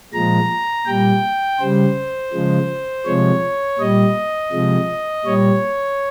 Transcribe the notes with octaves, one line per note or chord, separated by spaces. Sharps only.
A#2 F3 G#3 A#5
A#2 G3 G5
C#3 G3 C5
C#3 F3 G#3
C3 F3 G#3 C#5
A#2 G3 D#5
C3 F3 G#3
A#2 G3 C#5